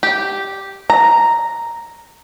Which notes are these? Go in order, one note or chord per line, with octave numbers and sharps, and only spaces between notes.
G4
A#5